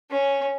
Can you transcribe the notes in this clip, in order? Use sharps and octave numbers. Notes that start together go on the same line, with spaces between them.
C#4